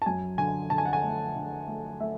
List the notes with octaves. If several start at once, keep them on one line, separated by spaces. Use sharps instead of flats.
A5
F#2 G#5
D3 G#5
D3 A5
G#5
F#5
G#5
A3
D3
A3
A3 E5